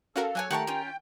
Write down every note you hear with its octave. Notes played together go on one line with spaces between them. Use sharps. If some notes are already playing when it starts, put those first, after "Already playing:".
C#4 F#4 A4 A#4 F5
F#3 C#5 G#5 F#6
D#3 A3 G4 A#4 F#5 G5 A5 C#6
C#4 F4 G5